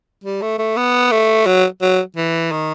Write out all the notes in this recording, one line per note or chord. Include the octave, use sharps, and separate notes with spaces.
G3
A3
A3
B3
A3
F#3
F#3
E3
D#3